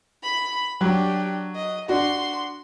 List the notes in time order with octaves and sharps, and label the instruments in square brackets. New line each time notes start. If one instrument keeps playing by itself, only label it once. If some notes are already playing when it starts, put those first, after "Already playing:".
[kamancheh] B5
[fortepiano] F#3 [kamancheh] D4 G4
[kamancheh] D#5
[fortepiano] D4 F#4 [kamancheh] C6